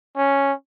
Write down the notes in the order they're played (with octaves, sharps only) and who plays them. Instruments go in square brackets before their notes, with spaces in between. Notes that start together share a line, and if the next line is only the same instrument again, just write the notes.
[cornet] C#4